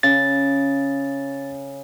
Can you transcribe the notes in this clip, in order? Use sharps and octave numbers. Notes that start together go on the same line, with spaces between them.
C#3 A6